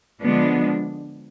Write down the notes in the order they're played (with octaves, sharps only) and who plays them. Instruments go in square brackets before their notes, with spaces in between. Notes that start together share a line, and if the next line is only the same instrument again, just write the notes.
[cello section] D3 F3 G#3 B3 D4